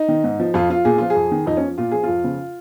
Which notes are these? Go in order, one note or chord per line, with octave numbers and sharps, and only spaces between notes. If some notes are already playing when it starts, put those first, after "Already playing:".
Already playing: D#4
D#3
G#2
F3
F2 F4
F3 F4
A#2 G#4
F3 F4
G#4
F2
D#3
F2 D#4
C#4
F3
A#2 F4
F3 G#4
F2 F4
C#3 F3